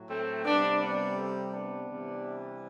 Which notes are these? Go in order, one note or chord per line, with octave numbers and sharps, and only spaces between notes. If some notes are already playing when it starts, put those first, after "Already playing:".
Already playing: A2 F#3
A3 C4
C3 G3 B3 D4
B3 D4
A3 C4
B3 D4
C3 E3 G3